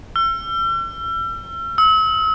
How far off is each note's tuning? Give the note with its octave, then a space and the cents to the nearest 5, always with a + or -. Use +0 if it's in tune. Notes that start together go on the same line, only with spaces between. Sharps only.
E6 +40
E6 -40